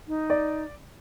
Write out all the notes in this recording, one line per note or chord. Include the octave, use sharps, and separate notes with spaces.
D#4
D5